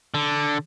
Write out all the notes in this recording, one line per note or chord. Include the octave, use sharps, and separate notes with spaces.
D3